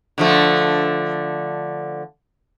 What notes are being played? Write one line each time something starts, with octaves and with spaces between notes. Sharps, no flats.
D3 F3 A3